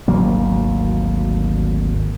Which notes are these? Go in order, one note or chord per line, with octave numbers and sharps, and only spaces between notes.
G#1 D2 F#3 A#3